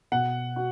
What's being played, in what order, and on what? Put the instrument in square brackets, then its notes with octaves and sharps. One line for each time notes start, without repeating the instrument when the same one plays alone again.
[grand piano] B2 [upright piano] F#5
[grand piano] F#4